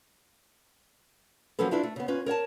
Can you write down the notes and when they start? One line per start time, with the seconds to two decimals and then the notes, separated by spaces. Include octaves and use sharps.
1.59 F3 F#3 A#3 C#4 A4 B4
1.71 D4 E4 F4 B4
1.83 A3
1.96 C#3 B3
2.08 C#4 F4 B4
2.26 A#4 C#5 F#5 A5